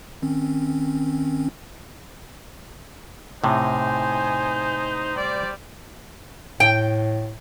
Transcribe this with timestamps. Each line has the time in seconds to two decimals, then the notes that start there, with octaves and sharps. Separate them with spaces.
0.22 D#3 C4 C#4
3.44 A2 C3 D#4 C5 G#5
5.17 G3 D5
6.60 A2 G5